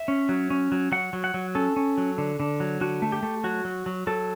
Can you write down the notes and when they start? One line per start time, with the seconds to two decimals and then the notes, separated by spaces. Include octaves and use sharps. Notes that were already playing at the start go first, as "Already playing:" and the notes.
Already playing: E5
0.08 C#4
0.29 F#3
0.50 C#4
0.72 F#3
0.92 F#3 F#5
1.13 F#3
1.24 F#5
1.34 F#3
1.55 C#4 A4
1.76 C#4
1.98 F#3
2.18 D3
2.40 D3
2.60 F#3
2.81 D3 F#4
3.02 A3
3.12 G4
3.23 A3
3.44 F#3 F#4
3.65 F#3
3.86 F#3
4.07 F#3 A4